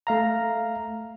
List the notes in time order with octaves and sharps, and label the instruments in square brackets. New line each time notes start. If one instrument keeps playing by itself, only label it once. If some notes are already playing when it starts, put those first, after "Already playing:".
[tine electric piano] A3 F5 A#5